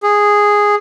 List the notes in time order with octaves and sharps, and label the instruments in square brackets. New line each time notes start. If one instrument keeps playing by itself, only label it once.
[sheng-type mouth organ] G#4